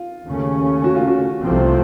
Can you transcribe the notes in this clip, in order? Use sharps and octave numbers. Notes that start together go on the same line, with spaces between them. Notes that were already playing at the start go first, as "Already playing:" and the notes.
Already playing: F4
D#2 C#3 A3 C#4
F#4
F4
F#4
C2 C3 F3 A3 C4